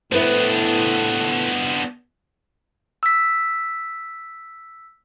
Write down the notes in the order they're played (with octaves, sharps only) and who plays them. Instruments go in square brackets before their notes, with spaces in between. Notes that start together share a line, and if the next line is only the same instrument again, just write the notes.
[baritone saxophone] A2 [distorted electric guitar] B3 D4 [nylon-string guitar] E4 B4 C5
[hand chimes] E6 B6